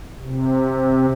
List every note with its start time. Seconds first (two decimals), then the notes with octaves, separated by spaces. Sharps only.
0.20 C3